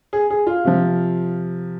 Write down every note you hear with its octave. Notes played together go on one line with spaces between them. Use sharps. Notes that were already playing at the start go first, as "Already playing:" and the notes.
G#4
G#4
F4
C3 F3